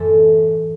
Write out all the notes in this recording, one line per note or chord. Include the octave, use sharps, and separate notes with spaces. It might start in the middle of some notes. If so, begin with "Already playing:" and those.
Already playing: F#2 A2 E3 A4 C5